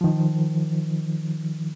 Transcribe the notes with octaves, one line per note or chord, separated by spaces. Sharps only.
D#3 F3